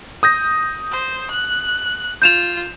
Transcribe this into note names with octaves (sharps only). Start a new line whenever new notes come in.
D#6 G6 A#6
C5
F#6
F4 G6 E7 F7